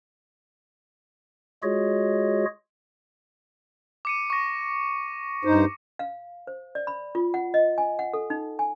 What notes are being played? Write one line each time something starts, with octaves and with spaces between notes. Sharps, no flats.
G#3 F4 F#4 G#4 C#5 D#5
D6 C#7 D#7
C#6 A#6
G2 D#4 C5
F5
C5
D5
B5
F4
F#5
D#5
G#5
F#5
A4
D#4
G#5